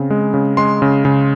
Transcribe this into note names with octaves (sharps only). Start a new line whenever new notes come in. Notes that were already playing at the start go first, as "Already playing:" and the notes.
Already playing: C#3 C4
G#3
C#3
G#3 C6
C#3
C#3